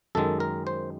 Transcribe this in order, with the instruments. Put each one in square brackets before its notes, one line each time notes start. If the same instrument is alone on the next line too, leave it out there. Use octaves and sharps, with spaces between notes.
[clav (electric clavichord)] F#2 D#3 G#3 A4
A#4
C5